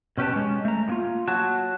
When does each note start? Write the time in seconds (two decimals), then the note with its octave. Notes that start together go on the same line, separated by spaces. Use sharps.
0.18 B2 C#4 G4 B4 A5
0.33 G#3 C#4
0.65 A3 A#5
0.88 A2 A#3 F4
1.28 F#3 F#4 A5